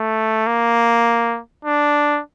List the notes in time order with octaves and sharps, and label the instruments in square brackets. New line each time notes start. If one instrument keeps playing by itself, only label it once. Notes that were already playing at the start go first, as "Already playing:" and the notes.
Already playing: [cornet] A3
A#3
D4